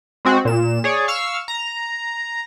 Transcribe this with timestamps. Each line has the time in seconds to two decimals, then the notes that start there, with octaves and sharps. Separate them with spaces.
0.25 G#3 C4 F#4
0.45 A#2 E7
0.84 G#4 C#5 D5
1.08 F5 C#6 E6 F6
1.48 A#5